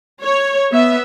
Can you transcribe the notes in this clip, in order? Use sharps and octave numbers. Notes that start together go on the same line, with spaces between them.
C#5
B3 E5